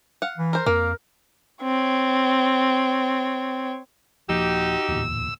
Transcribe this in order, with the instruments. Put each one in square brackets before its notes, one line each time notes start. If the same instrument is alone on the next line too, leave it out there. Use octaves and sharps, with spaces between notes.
[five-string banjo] F5 F#5
[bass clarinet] E3
[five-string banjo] A#4 C5
[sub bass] F2 [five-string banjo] A#3 [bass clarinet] A#4
[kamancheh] C4 C#5
[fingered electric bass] D#1 F3 A#3 [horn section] D#4 F#4 G4 [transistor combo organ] E6
[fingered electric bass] D1 E2 A#2